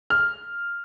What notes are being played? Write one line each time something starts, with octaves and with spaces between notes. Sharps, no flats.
F6